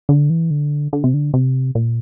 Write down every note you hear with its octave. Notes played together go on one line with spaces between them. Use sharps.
D3
E3
D3
D3
C3
D3
C3
A#2